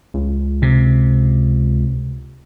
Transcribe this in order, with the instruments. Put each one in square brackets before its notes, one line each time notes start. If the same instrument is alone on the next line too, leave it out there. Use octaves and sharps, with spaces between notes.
[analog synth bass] C#2
[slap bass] C3